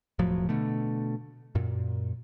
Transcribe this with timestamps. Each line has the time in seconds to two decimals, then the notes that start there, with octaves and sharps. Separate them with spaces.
0.19 E1 A2 F3 F#3
0.49 B2 D3 A3
1.55 F#2 A#2